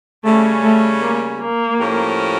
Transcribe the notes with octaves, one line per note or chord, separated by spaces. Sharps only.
C#3 G3 A3 C#4
A3
A#3
A#3
A2 F3 C#4 G4 A#4